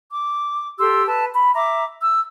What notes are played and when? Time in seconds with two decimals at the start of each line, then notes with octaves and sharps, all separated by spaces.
0.10 D6
0.79 G4 A4 C6 E6
1.07 B4 A5
1.34 B5
1.55 E5 A#5 D6
2.03 E6